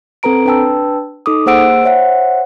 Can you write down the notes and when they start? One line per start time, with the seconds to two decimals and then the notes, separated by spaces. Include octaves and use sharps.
0.23 C4 A4 B4 A#5 D7
0.45 D4 B4 G5 A5 E6
1.26 D#4 A4 D6 D#6
1.46 A#3 G#4 C5 F#5 E6 D7
1.83 C5 C#5 E5 F#5